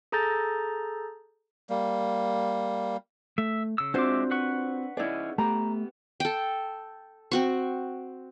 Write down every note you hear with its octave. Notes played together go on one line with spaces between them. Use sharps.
G#4 A4 A#5 G6 A6
G3 A#3
A3 E5
C#3 E6
G#3 C4 D4 F4 F#4 C5 E5 D6
B4 F#5 C#6
C#4 D#4 E4 G#4 D5
A3 B3 G4 A#5 B5
A4 G5
C4 F#4 C#6